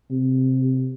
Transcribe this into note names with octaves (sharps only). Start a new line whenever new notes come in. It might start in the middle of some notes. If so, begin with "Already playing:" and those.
C3